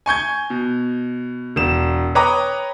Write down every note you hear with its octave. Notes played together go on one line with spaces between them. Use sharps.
G#5 C#6 G6 G#6
B2
E1 E7
B4 C#5 G5 A#5 D6 D#6